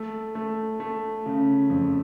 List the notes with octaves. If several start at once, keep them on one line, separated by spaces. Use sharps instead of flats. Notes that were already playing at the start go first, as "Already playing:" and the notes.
Already playing: A3
A3
A3
C#3
F2